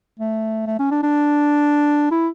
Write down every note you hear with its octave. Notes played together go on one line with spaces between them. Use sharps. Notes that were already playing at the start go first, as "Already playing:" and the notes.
A3
A3
C#4
D4
D4
E4